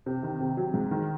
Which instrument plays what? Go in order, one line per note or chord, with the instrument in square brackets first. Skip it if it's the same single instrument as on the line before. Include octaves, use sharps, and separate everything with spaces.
[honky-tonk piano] C3
D#3
C3
F#3
G#2
D#3